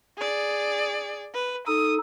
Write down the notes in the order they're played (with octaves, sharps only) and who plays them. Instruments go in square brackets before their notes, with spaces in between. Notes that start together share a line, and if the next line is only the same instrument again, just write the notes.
[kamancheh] G#4 D5
B4
[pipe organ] D#4 A4 [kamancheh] D#6